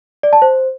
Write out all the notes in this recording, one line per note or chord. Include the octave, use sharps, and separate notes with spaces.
D5
A5
C5